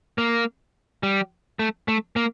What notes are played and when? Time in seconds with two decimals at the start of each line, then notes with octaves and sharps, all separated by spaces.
0.18 A#3
1.03 G3
1.59 A3
1.88 A3
2.16 A#3